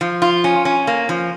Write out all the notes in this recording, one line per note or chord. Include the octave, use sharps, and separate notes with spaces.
F3
F4
C#4
C#4
A#3
F3